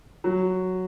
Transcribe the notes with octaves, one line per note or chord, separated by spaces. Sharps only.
F#3